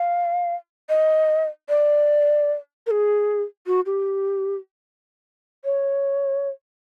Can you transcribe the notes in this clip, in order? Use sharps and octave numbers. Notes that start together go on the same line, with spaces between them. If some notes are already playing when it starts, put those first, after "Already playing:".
Already playing: F5
D#5
D5
A#4
G#4
F#4
G4
C#5